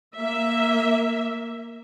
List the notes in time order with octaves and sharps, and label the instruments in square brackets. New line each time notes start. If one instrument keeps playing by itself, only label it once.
[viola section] A#3 E5